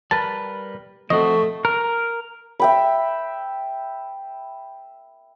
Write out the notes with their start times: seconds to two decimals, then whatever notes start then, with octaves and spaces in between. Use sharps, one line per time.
0.11 G3 A#4 B4 A5
1.10 F3 A3 C4 F#4 D#5 C#6
1.65 A#4
2.60 E5 G5 B5